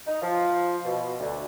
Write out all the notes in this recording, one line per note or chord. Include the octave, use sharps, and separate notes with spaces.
D#4
F3
B2
D2